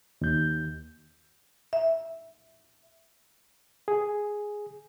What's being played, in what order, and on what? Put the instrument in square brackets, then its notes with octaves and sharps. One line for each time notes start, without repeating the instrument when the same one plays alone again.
[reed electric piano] D#2 G6
[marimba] E5
[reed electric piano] G#4